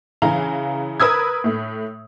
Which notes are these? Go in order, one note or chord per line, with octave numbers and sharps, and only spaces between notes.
C#3 E3 F5 A#5
A#4 B4 D#6 E6 G#6
A2 A3